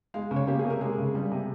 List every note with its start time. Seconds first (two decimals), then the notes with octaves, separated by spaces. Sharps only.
0.14 G#3 F5
0.31 C#3
0.36 C#5
0.47 A#3 G4
0.59 G#4
0.65 C3
0.70 A#4
0.81 G#3 G#4
0.98 C#3
1.15 G3
1.32 C3